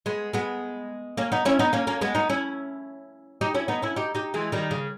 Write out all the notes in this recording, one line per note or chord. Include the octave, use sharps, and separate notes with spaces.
G#3 B3
G#3 B3
A#3 C#4
B3 D#4
C#4 E4
B3 D#4
A#3 C#4
A#3 C#4
G#3 B3
B3 D#4
C#4 E4
D#4 G4
C#4 E4
B3 D#4
C#4 E4
D#4 G4
D#4 G4
E3 G#3
D#3 G3
C#3